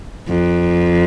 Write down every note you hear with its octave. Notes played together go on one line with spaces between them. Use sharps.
F2